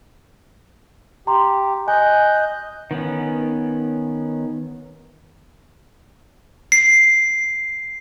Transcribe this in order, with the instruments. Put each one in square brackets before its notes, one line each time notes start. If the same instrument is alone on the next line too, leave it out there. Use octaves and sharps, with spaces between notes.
[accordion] G4 [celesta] A#5 C6
[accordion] D#5 F#6 G6 [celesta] G#5
[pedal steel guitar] D#3 B3 C#4
[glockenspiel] C7